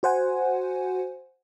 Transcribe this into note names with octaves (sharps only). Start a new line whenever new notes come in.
F#4 C5 F#5 G#5